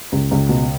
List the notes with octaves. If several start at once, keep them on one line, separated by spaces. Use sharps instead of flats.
C#2
C#2
B2